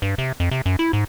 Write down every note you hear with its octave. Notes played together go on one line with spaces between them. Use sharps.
G2
C3
F2
C3
F#2
E4
G#2